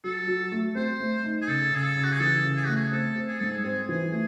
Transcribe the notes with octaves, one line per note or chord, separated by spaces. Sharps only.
F#3 A4
F#3
A3
C4 C5
A3
D#4
G#4
C#3 A4
C#3 G#4
A4
C#3
F#4
G#4
E3 A4
C#3
G#4
A3 F#4
G#4
C4 A4
C4
G#4
G#2 A4
G#4
C4 G#4
E3 G#4
A3 G#4